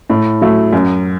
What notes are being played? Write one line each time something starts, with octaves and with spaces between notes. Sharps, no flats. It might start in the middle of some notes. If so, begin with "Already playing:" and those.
A2
F#3 A3
F#2